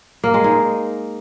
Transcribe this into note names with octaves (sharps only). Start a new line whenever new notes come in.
A#3
G#3
D#4